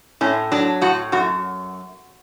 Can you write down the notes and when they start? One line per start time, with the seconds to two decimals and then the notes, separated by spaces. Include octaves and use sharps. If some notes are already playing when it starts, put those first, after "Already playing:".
0.21 A2 C#4
0.52 F#3 D4
0.82 A2 F#4
1.12 F#2 F#4